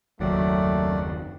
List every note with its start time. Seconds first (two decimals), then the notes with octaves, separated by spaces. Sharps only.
0.20 F#1 D#2 D#3 F#3 A3 D5 F#5